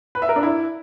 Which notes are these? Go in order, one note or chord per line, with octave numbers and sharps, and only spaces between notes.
B4
E5
A#4
D4
E4